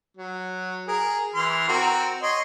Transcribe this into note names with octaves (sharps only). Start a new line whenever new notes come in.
F#3
G#4 A#4
E3 C6 F6
C4 F#4 A#4
C#5 D#5 C6